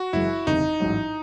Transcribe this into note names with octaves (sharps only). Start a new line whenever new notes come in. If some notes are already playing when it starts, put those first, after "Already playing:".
Already playing: F#4
F#1 F#2 E3 G#3 E4
F#1 E2 C3 D#3 D#4
A1 G#2 F#3